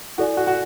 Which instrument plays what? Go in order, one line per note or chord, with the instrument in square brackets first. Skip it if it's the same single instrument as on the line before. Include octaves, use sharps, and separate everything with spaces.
[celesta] E4 A4 D5 G#5 [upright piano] F#4
[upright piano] F#4
F#4